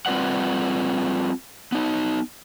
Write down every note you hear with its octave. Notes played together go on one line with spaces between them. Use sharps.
G3 C4 F4 B4 D5 F#5
B3 D#4